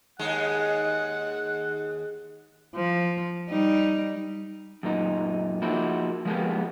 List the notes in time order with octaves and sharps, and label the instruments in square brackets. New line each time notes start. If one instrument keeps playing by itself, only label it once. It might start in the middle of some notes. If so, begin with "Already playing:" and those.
[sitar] D#2 G#3 [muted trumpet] F#5
[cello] F3
G3 D#4
[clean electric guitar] F#2 A#2 D#4
F3 A#3 D#4 E4 F#4
F3 G#3 A#3 B3 G4